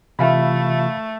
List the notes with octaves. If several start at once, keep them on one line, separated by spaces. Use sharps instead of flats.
C3 E3 A3 F4 E5 F5 B5